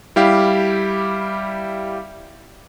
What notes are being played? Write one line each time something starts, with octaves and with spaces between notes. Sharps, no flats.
G3 E4 G4 F5